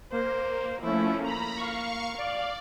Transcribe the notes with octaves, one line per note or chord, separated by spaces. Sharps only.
A#3 C5
F3 A3 C#4 E4
A#3 A#5 B5
F5 C#6
D5 F5